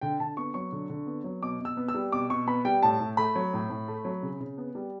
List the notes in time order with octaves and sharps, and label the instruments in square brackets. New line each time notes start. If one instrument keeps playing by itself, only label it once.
[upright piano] D3 G5
D3 A5
B3 C#6
F#3 C#6
D3
D3
B3
F#3
B2 D6
B2 E6
B3
E6
G3
B2 D6
B2 C#6
B3 B5
G3 G5
A2 A5
A2
A3 B5
F#3
A2
A2
A3
F#3
C#3
C#3
B3
G3